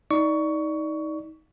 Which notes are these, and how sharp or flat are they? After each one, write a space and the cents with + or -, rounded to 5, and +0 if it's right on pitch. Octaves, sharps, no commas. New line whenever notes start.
D#4 +20 D5 +0 C#6 +20